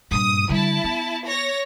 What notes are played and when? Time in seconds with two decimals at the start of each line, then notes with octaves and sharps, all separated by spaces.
0.11 G2 A#2 D#6
0.49 D3 G3 E4 A5
0.84 B3
1.26 C#5 A#6